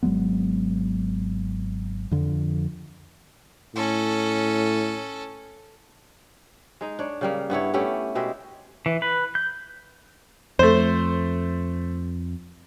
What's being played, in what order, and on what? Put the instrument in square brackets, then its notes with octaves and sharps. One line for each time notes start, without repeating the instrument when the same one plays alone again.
[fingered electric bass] G#1 F#3 G#3 B3
F2 D3 F3
[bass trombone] A2 [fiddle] C#4 A4
[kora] G#3 D#4
D4 C#5
C#3 G3 A#3
G2 B3 E4 C#5
A3 C#4 E4 G4
B2 G#3 G4 E5
[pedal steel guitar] E3
B4
G6
[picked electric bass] F2 [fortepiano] A3 C5